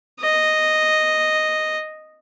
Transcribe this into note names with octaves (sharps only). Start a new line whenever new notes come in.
D#5